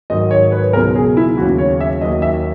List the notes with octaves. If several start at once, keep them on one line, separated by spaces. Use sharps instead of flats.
G#2 D#3 F#3 D#5
C#5
B4
C#2 B2 F#3 A#4
G#4
E4
D#2 C#3 F#3 F#4
C#5
E5
D#2 D#3 F#3 D#5
E5